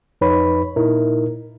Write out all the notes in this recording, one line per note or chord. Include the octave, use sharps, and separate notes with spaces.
F2 D#4 B4 C#5 B5
A#2 D#4 E4 A#4